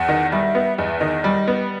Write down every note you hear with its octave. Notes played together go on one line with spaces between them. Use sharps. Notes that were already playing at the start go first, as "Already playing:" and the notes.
Already playing: E2 F#5
D#3
G3 E5
B3
E2 D#5
E5
D#3 D#5
G3
B3